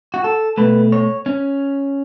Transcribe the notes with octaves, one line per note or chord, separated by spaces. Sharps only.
F#4
A4
B2 A3 B4
C#5
C#4